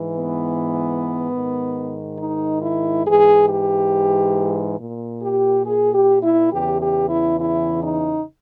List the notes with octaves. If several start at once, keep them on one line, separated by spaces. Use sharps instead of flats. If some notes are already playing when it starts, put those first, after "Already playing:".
Already playing: G#2 E3
B3
G#2 D#3
D#4
E4
G#2 E3 G#4
G4
A#2
G4
G#4
G4
E4
E2 C#3 E3 G4
G4
E4
E4
D#4